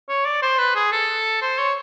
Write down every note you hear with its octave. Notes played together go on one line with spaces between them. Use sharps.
C#5
D5
C5
B4
G#4
A4
C5
C#5